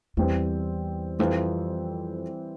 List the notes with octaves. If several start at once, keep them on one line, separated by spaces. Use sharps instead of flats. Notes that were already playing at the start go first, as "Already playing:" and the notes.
E2 E3 G3 C4
F2 E3 G3 C4